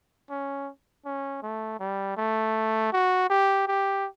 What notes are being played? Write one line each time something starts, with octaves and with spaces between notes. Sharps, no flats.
C#4
C#4
A3
G3
A3
F#4
G4
G4